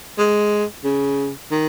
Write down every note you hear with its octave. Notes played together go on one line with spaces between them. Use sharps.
G#3
C#3
D#3